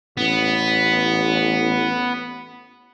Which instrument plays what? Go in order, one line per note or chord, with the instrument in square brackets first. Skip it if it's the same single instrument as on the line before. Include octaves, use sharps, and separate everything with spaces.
[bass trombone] A1 [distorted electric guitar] B3